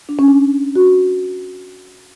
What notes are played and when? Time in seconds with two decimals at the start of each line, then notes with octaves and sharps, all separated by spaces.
0.09 D4
0.19 C#4
0.28 D4
0.76 F#4